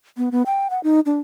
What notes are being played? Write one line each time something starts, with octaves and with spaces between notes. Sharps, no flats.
B3
B3
G5
F#5
D#4
D4